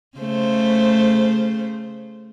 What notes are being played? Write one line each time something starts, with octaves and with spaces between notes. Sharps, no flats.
C#3 A3 C5